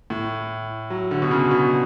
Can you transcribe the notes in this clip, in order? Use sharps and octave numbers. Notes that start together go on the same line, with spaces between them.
A2
F#3
D3
B2
C#3
B2